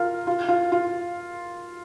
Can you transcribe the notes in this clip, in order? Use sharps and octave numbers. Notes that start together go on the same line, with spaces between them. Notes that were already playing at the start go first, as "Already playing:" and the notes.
Already playing: F4 A#4
F4
F4
F4